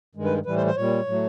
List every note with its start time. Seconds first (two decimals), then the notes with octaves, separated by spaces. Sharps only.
0.15 G2 D#3 G#3
0.25 B4
0.46 A2 E3 G3 B4
0.56 C5
0.66 C5
0.76 A#2 G3 C#5
1.06 A2 F#3 A3